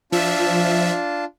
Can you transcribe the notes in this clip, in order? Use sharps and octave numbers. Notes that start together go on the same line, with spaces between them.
F3 D4 F4 E5 A5